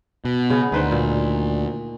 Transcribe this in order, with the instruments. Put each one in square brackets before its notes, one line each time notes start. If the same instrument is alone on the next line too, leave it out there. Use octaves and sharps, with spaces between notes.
[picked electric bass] B2
[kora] C#3 B3
[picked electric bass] D2 [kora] D#3 B4 C5
[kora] A#2